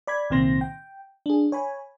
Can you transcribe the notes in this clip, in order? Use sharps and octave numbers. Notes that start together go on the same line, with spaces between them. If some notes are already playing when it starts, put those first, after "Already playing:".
D5 B5 G#6
C2 A#2 D#3 C4 C6 A#6
G5
D4 G#4
C#5 G#5 B5